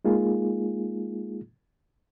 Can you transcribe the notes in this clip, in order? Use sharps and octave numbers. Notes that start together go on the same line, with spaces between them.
G#3 A#3 D#4 F4 G#4